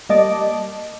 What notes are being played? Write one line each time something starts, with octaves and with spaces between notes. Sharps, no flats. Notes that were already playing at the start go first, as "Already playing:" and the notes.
G3 A#3 D#5 A5 D6